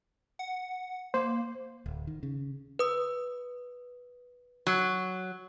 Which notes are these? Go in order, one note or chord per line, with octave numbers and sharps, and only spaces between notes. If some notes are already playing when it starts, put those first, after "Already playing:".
F#5
A#3 C5
D1
D#3
C#3
B4 D#6
F#3